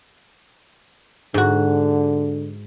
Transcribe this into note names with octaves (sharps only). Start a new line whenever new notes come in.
G#2 D3 F#4